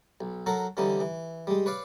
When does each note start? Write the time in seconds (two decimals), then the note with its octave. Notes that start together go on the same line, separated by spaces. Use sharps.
0.21 B1
0.46 F#3 F#4 A4 A#4
0.77 D3 E3 G3 C#4 D#4
1.00 E3
1.47 G3 G#3
1.66 B4 C#5 D5 F5